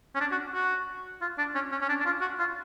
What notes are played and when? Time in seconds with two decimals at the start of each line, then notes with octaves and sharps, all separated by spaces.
0.15 C#4
0.21 D4
0.32 F#4
0.54 F#4
1.21 F4
1.38 D4
1.55 C#4
1.71 C#4
1.82 C#4
1.89 D4
2.00 D4
2.05 F4
2.21 F#4
2.39 F4